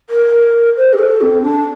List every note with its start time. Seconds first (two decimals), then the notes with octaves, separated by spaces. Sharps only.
0.10 A#4
0.77 C5
0.93 G4
0.99 A4
1.21 C4
1.43 D4